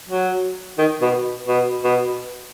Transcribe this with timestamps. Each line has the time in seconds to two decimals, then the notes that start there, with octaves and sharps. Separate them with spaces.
0.09 F#3
0.78 D#3
1.01 B2
1.48 B2
1.83 B2